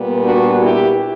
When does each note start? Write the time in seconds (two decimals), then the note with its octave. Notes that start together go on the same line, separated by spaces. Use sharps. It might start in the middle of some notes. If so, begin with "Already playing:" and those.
Already playing: A#2 G3 B3
0.25 D4 F#4
0.62 E4 G4